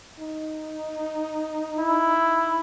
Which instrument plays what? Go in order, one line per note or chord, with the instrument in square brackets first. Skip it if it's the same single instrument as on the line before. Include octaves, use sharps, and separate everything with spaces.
[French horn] D#4
[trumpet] E4